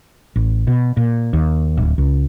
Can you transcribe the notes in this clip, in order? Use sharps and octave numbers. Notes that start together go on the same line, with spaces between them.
A1
B2
A#2
D#2
D1
C#2